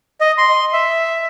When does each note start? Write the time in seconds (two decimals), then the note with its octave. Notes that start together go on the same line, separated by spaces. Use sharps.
0.21 D#5
0.38 C6
0.73 E5